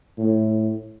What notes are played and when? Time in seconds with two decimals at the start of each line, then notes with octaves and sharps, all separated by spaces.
0.18 A2